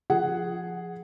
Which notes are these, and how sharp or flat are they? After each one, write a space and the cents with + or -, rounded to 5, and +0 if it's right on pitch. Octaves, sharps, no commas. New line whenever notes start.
F3 +0 G#4 +0 F#5 +0